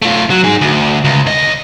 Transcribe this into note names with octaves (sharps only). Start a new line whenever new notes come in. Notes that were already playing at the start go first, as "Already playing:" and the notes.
A3 F4
F#3
D#4 G#4
D2
C#2
D#2 D#5